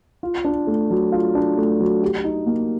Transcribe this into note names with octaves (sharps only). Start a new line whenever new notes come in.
F4
D4
A3
F#3
F4
D4
A3
F#3
G4
D#4
A#3